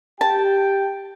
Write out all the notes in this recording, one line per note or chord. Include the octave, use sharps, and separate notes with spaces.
G4 G5 A5